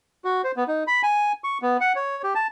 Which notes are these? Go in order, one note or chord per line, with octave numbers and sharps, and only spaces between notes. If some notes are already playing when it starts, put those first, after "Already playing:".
F#4
C5
B3
D#4
B5
G#5
C#6
B3
F#5
C#5
G4
A5